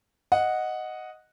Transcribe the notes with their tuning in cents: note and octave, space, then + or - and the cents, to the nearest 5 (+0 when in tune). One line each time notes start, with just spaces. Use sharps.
D#5 +0 F#5 -5